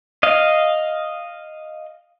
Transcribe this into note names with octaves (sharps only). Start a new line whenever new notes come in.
D#5 F5